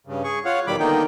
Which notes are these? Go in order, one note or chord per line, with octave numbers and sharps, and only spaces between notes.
G2 C#3
G#4 C#6
F4 C#5 F5 F#5
E2 B2 D#3 G3 B5 D6
D3 D#3 A#3 B3 D#4 G5